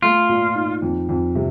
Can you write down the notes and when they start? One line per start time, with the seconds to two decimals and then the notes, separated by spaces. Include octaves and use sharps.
0.02 A3 F4
0.29 A#2
0.55 D#4
0.82 F2
1.09 F2
1.35 C3